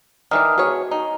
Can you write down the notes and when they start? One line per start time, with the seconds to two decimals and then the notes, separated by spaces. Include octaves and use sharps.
0.31 D#3 E3 D4 A#5 D#6 F6
0.58 B3 F#4 G#4 C#5
0.91 D#4 A#5